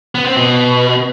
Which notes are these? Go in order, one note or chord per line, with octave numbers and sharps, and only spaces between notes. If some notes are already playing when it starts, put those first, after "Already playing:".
B3
C4
B2